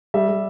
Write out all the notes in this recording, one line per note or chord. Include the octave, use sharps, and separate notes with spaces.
G3 E5
G3